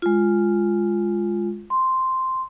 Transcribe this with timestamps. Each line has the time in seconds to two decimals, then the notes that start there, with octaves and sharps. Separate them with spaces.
0.02 G#3 F4
1.70 C6